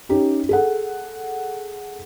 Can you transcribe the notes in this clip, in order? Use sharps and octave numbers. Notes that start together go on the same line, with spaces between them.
C#4 D#4 G4
G#4 A4 F#5